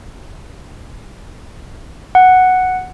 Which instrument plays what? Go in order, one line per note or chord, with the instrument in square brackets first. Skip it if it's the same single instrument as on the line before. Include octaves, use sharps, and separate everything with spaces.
[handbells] F#5